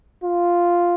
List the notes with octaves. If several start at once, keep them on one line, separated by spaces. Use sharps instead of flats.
F4